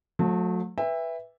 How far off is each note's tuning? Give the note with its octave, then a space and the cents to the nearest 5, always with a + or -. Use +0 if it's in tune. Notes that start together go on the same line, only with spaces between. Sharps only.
F#3 -40 A3 +0 C5 +15
B4 +0 E5 +0 G5 +45